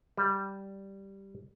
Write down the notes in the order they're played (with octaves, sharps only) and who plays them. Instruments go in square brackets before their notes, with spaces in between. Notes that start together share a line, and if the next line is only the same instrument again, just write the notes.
[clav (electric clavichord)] G3